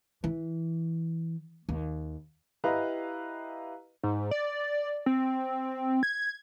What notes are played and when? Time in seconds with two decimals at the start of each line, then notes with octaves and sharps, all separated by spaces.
0.24 E3
1.69 D#2
2.64 E4 G4 B4 D#5 F5 A#5
4.04 G#2
4.31 D5
5.06 C4
6.03 G#6